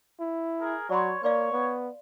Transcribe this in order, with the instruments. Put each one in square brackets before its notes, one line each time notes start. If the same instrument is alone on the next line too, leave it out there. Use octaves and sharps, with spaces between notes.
[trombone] E4
[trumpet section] G#4 A#4
[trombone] F#3 [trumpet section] C#5 [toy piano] D5 B5 C6
[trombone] A#3 [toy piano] B4 D5 F5 [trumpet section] C#5
[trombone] B3